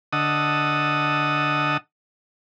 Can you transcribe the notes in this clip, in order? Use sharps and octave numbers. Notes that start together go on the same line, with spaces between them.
D3 D#5 F#5 A5 D#6 E6